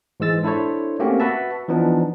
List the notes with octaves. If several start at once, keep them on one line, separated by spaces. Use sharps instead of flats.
G#2 E3 G#3 E6 A6
D4 E4 A4 C5 C#5
A3 A#3 C4 C#4 F#4 G4
F#4 B4 E5 A5
E3 F3 B3 D4 D#4